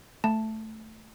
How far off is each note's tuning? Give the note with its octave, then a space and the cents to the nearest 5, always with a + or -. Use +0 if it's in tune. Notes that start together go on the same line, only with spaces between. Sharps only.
A3 +0 A5 +0